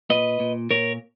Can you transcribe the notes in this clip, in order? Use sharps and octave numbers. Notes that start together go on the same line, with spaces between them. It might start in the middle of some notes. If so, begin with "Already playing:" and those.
A#2 B4 D#5
A#2
A#2 A#4 C#5